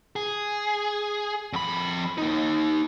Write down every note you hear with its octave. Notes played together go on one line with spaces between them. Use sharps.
G#4
F2 B5
A#3 D#4